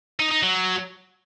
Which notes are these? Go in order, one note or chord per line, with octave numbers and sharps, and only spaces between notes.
D#4
D#4
F#3